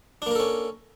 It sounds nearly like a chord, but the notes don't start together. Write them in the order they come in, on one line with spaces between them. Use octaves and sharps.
D4 A#3 A#4 A4 C#4